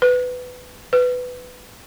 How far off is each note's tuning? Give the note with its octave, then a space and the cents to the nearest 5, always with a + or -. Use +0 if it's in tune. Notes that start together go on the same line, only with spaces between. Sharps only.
B4 +15
B4 +10